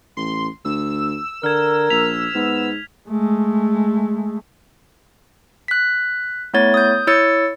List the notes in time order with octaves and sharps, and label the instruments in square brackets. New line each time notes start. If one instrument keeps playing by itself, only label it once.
[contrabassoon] A1 [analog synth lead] C6
[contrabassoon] D2 [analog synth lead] E6
[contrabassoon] D3 [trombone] A#4 [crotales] F6 G#6
[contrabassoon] A#1 [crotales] B6 F7
[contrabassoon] G#2 [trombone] B3
[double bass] G#3 A3
[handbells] F#6 B6
A3 B3 E4 C#5 A6
D#6 G6
E4 C#5 E6 A6 C#7